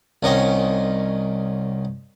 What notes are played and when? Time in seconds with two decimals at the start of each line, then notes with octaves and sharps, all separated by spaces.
0.23 C2 D#3 C#4 D#5